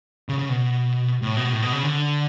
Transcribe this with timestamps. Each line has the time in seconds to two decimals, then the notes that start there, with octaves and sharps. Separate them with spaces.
0.29 C#3
0.39 C#3
0.49 B2
1.22 A2
1.37 B2
1.52 A2
1.62 B2
1.73 C#3
1.83 D3